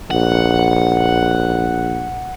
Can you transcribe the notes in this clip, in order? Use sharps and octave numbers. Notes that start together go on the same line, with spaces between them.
A#1 F#5